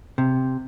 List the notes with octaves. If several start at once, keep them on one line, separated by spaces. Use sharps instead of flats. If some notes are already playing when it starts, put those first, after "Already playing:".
C3